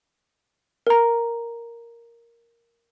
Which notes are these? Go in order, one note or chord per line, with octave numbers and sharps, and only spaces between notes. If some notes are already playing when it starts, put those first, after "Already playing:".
A#4 A#5